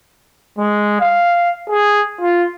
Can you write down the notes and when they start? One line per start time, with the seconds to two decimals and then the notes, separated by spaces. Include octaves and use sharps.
0.58 G#3
1.00 F5
1.69 G#4
2.21 F4